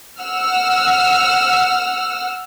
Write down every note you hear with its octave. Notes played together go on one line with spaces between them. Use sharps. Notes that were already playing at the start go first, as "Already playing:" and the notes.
F#5 E6 F6